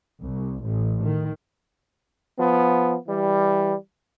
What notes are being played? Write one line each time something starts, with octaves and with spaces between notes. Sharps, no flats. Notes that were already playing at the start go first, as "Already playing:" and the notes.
C2
A1
D#3
F3 B3
E3 G3